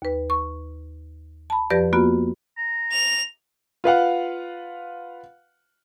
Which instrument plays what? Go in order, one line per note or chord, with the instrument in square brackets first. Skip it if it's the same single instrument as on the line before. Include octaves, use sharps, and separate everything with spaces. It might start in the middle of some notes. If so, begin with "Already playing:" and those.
[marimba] D#2 B4
C#6
A5 B5
F2 F3 G4 B4 D5 A#6
A#3 B3 F4 F#4
[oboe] A#5
[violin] F7
[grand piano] F4 B4 F5 F#5